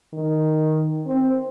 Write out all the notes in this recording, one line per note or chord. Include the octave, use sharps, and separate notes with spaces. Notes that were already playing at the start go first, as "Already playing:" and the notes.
D#3
C4